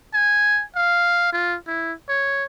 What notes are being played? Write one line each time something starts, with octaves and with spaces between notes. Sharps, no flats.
G#5
F5
F4
E4
C#5